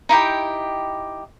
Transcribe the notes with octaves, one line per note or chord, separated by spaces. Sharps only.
D#4 E4 G4 G5